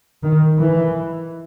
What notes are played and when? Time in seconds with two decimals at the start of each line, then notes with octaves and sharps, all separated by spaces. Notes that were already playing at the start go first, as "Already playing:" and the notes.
0.23 D#3
0.57 E3